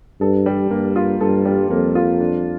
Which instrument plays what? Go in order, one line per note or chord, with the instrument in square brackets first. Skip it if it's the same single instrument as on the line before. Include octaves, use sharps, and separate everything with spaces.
[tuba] G2 [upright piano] A4
[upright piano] G3
[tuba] G2 [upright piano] A#3
[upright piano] F4
[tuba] G2 [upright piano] A4
[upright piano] G3
[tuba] F2 [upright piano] A#3
[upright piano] F4
D4